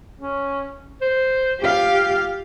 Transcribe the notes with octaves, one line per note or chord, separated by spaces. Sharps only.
C#4
C5
F4 G4 F5